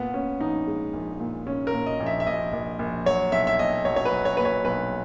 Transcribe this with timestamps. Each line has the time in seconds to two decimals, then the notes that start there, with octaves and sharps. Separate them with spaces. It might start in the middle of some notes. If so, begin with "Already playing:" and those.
Already playing: A#2 B3
0.14 A#2 C#4
0.41 A#1 D#4
0.67 G#3
0.94 A#1
1.20 A#2
1.47 A#2 C#4
1.67 A#4
1.73 A#2
1.86 D#5
2.00 A#1
2.06 E5
2.20 E5
2.26 A#1 D#5
2.53 A#1
2.79 A#1
3.06 F#3 C#5
3.32 B1 E5
3.47 E5
3.59 B1 D#5
3.85 F#3 C#5
3.96 C#5
4.05 B4
4.12 F#3
4.25 C#5
4.37 A#2 B4
4.45 C#5
4.65 B1 B4